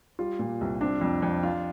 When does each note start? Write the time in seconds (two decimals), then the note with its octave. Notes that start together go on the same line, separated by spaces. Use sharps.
0.19 G3 F4
0.39 A#2
0.61 C2
0.81 C4 D4
1.01 F2
1.22 F2
1.43 F4